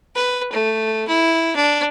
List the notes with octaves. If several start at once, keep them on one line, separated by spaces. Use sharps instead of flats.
B4
A3
E4
D4